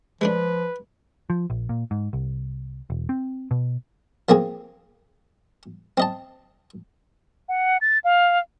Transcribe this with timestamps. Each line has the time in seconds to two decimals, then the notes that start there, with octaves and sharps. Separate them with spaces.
0.21 F3 G#3 A3 D4 B4
1.30 F3
1.50 A#1
1.69 A#2
1.91 G#2
2.13 C2
2.90 E1
3.09 C4
3.51 B2
4.29 F3 A#3 C4 G#4
5.98 C4 D#5 A5
7.49 F#5
7.81 A6
8.04 F5